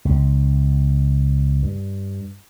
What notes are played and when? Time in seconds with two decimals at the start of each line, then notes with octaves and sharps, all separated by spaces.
0.05 C#2
1.63 G2